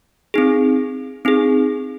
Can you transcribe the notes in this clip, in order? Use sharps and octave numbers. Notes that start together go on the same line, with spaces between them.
C4 D#4 G#4
C4 D#4 G#4